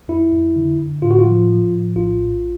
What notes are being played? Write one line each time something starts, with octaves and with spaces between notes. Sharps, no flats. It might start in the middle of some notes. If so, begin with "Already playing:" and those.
F2 E4
F2
D3
D3
A2 F4
F#4
F4
F3
F3
A2
A#1 F4
A#1